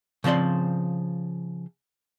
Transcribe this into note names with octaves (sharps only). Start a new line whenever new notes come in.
C#3 F3 C4 D5 C6